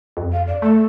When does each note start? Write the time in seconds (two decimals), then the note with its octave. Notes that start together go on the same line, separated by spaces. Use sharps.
0.17 F2
0.32 F5
0.47 D5
0.62 A3 A4